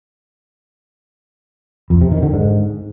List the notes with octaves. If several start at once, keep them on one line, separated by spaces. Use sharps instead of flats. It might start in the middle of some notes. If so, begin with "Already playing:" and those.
F2
C3
D#3
D3
G#2